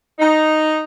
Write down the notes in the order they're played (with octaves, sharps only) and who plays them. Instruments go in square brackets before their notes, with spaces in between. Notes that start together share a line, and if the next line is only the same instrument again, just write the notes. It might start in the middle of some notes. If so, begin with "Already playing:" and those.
[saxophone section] D#4